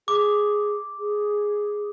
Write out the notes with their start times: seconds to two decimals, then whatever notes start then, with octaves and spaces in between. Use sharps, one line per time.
0.08 G#4 D6
0.99 G#4